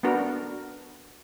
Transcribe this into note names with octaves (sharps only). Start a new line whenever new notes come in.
B3 D4 F#4 A#4